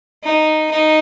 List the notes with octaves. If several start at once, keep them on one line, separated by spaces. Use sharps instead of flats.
D#4
D#4